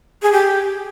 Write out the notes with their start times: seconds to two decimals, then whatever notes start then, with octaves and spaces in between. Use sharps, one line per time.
0.22 G#4
0.32 G4